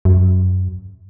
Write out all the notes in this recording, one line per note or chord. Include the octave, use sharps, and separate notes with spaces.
F#2